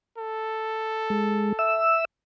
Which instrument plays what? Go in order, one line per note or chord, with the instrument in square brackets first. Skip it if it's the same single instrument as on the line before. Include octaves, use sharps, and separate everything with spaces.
[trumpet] A4
[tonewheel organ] G#3
E5 E6